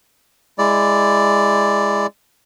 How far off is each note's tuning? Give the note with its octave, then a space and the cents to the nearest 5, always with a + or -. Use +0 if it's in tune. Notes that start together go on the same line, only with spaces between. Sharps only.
G#3 -10 E4 +0 D5 +0